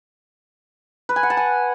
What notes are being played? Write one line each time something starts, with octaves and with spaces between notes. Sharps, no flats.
B4
G#5
F#5
A5
G#5